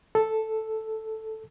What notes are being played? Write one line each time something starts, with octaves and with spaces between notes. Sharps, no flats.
A4